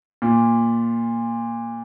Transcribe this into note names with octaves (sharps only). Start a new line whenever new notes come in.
A#2